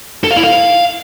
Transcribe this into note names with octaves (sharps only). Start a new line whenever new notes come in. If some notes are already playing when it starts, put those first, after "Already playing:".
A4
F5
E4
F5